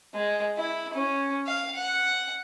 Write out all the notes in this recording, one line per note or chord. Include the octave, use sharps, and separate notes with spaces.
G#3
E4
C#4
F5
F#5